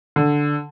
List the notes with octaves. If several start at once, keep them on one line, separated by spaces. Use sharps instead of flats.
D3